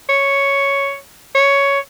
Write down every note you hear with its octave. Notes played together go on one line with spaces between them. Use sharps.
C#5
C#5